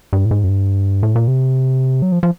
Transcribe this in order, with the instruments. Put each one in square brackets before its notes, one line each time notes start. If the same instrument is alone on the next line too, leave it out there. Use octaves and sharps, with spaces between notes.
[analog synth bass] G2
A2
G#2
F#2
G2
A2
A#2
C3
F#3
F3
F3